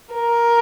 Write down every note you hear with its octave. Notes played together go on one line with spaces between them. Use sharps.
A#4